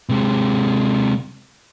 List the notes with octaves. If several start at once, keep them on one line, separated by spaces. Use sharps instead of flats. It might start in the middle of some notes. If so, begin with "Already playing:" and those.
C3 G#3